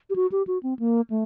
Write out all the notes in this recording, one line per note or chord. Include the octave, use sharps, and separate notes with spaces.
G4
F#4
G4
F#4
C4
A#3
A3